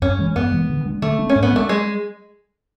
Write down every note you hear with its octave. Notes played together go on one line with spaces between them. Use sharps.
F#2 C#4
E3 G#3
F#2 B3
E3 G#3
D3
G#3 B3 D4
D3 A3
G#3 B3 D4
C#4
G#2
B3
G#3 A3 D4
G#3